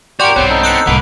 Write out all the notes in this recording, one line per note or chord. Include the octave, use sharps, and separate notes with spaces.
F#4 G4 A#4 D5 C6
B1 G2 B3 C4 C#5
D#4 A4
B3 C4 E6 F#6 C#7
C2 A2 A#3 B4 F#5